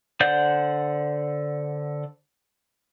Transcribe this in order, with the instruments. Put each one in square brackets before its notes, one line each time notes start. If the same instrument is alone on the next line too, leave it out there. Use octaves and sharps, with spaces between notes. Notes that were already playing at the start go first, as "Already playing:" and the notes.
[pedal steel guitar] D3 C5 D5 F#5 G6